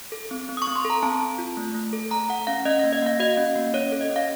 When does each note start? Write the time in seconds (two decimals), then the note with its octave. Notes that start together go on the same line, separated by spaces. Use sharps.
0.12 A4
0.31 C4
0.49 C4
0.57 D#6
0.62 C#6
0.67 C4
0.76 C6
0.85 A4
0.90 A#5
1.03 C4 A5
1.21 C4
1.38 F4
1.57 A3
1.75 A3
1.93 A4
2.11 A3 A#5
2.29 A3 F#5
2.47 C#4 F5
2.65 C#4 D#5
2.79 A#3 F5
2.93 D#5
3.02 A#3 F5
3.19 F#4 D#5
3.37 C#4
3.55 A#3
3.74 C#4 C#5
3.92 A4
4.01 D#5
4.10 C#4
4.16 F5